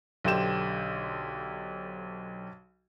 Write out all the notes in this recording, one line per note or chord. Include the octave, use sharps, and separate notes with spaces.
B1 D3 G4 C5 E7